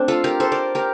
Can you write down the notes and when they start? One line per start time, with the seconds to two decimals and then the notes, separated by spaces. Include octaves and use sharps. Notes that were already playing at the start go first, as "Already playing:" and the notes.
Already playing: A3 C4 D4
0.08 F4 A4
0.24 G4 A#4
0.40 A4 C5
0.52 A#4 D5
0.75 G4 A#4